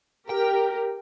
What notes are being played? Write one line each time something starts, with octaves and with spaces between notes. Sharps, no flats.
G4 A#4 G5